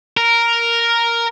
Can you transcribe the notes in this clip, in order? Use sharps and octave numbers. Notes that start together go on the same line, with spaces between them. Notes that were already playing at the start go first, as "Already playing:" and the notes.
A#4